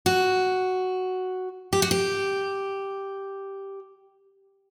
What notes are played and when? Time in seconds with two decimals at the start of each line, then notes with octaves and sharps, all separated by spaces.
0.06 F#4
1.73 G4
1.82 F#4
1.91 G4